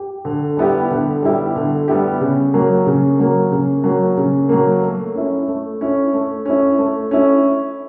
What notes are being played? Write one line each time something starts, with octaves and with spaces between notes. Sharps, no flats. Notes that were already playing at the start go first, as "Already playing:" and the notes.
Already playing: G4
D3
G3 B3 E4 G4
D3
G3 B3 E4 G4
D3
G3 B3 E4 G4
C#3
F#3 A#3
C#3
F#3 A#3
C#3
F#3 A#3
C#3
F#3 A#3
A3
C#4 E4
A3
C#4 E4
A3
C#4 E4
A3
C#4 E4